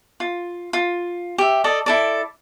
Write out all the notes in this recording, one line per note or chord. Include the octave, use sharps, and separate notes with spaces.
F4
F4
G4 E5
A4 D5 D#5
E4 A4 D5